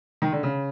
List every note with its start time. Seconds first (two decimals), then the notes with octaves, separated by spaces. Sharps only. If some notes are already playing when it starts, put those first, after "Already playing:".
0.22 D#3
0.32 D3
0.43 C#3